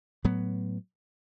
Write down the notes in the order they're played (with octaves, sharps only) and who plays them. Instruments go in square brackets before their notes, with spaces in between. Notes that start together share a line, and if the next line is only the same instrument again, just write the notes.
[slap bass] A2 F#3 B3